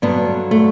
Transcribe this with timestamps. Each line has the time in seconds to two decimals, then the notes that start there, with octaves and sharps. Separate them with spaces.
0.02 G2 D3 F#3 B3
0.51 A3